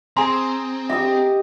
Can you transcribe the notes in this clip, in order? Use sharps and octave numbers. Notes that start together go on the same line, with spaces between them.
C4 G#4 G#5 A#5 C6
G4 D#5 E5